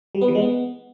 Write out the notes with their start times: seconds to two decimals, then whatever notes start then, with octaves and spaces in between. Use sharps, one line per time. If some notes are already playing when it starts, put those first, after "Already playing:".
0.15 G3
0.21 B3
0.28 E3
0.35 G#3
0.42 B3